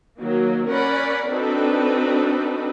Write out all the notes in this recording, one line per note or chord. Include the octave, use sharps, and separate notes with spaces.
D#3 F#3 A#3
C#4 A#4 D5 F#5 B5
C4 D4 D#4 F#4 A4 B4